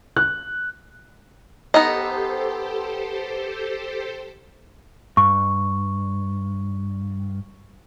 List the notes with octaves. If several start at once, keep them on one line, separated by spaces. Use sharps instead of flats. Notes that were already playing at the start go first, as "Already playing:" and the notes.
F#6
B3 D#4 G4 A4 C5 D#5
G2 C#6